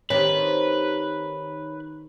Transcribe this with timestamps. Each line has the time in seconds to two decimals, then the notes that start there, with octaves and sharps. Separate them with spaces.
0.10 D#3 C4 G4 B4 C#5